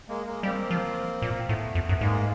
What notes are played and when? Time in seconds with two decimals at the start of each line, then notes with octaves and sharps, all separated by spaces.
0.09 G#3 A#3
0.26 G#3 A#3
0.43 G3 A#3 C4
0.71 F3
1.22 A#2
1.49 A2 A3 B3
1.75 F2
1.89 F#2
1.94 A3
2.01 G#2 G#3 A#3